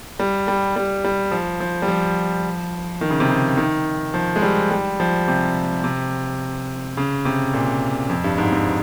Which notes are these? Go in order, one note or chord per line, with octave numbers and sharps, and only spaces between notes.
G3
G3
G3
G3
F3
F3
G3
F3
D#3
C#3
C3
C#3
D#3
F3
G#3
G3
G3
F3
C3
C3
C#3
C3
A#2
F2
G2
G#2
F2